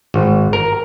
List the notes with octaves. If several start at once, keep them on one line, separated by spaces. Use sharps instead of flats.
G#1
A#4